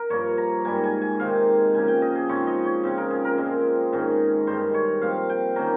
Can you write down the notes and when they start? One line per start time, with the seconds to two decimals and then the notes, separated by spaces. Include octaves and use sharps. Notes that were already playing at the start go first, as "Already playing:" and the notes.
Already playing: A#4 A#5
0.10 G2 F3 A#3 C#5
0.38 A#5
0.65 G#2 G3 A#3 G#5
0.83 G#5
1.01 G#5
1.20 C3 D#3 G#3 C4 F5
1.74 C#3 F3 A#3 G#5
1.88 G5
2.02 D#5
2.15 G#4
2.29 G#2 F3 C4 C#5
2.47 D#5
2.65 C#5
2.84 C#3 F3 C4
2.98 A#4
3.11 G#4
3.25 A#4
3.38 A#2 G#3 C4
3.93 G#2 D#3 G#3 C#4
4.47 G2 D#3 G#3 C5
4.74 C#5
5.01 A#2 F3 C4 F5
5.29 G5
5.56 D#3 A#3 C#4 A#5